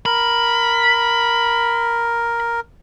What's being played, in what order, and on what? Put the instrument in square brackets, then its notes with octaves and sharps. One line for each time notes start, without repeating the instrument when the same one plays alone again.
[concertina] A#4 [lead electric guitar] B5